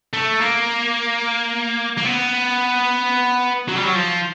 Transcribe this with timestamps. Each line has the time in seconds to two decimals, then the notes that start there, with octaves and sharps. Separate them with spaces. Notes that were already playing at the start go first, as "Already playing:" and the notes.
0.14 A3
0.41 A#3
1.98 A#3
2.05 B3
3.69 F#3
3.76 G3
3.84 F#3
3.95 F3